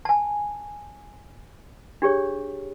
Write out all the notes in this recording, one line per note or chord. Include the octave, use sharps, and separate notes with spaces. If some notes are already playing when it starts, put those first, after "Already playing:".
G#5 A5
D4 G4 G#4 C#5